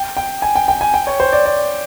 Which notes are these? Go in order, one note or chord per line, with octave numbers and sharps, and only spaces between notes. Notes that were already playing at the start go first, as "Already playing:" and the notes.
Already playing: G5
G5
G#5
G5
G5
G#5
G5
C#5
C5
D5
D5